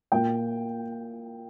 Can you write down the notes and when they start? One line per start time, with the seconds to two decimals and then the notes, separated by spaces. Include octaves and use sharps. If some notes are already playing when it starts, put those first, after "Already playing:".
0.12 A#2 A#3 G5